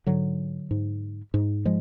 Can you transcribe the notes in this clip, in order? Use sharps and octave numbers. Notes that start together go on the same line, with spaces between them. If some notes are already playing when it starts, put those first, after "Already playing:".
G#2 D3 F#3
G#2
G#2
F3 G#3